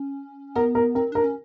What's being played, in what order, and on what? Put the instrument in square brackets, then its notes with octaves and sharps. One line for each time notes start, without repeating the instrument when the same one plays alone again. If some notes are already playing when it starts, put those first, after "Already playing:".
Already playing: [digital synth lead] C#4
[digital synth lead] B3 [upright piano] A#4
[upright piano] A#4
[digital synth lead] C4 [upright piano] A#4
[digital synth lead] D4 [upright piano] A#4
[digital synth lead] C#4